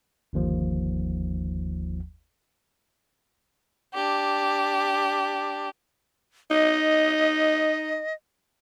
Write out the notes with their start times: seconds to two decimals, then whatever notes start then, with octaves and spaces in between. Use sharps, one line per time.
0.33 G1 D#2 F3
3.93 D4 G4
6.51 D#4 D#5